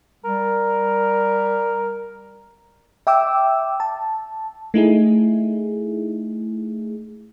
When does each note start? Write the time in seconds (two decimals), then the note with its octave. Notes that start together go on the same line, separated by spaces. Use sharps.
0.24 G3 A#4
3.07 E5 G5 D6 E6
3.80 A5
4.74 A3 D#4 E4 G#4